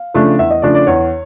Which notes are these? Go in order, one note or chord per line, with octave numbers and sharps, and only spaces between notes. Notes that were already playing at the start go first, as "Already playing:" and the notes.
Already playing: F5
C#3 F3 A3 D4
E2 E5
D#5
C#3 F3 A3 D4 D5
D5
E2 C#5